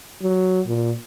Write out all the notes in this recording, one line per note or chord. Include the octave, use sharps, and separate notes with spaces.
F#3
A#2